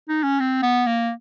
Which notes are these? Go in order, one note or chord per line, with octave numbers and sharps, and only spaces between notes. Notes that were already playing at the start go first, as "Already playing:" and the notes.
D#4
C#4
C4
B3
A#3